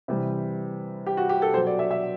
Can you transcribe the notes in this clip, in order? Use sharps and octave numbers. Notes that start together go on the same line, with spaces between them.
C3 E3 G3
G4
F#4
G4
A4
B2 F#3 C5
D5
E5
E5